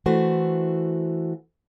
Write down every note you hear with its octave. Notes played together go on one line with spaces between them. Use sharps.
E3 A3 F#4 C5